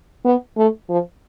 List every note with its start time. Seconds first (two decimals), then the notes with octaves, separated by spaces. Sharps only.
0.25 B3
0.57 A3
0.89 F3